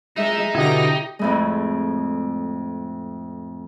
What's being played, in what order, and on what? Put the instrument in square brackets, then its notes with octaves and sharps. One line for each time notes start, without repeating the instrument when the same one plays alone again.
[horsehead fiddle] G#3 E5 [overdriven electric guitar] D#4
[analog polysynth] B2 D3 A#6 [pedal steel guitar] E4 D#5 [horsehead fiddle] G4
[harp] F2 A2 G#3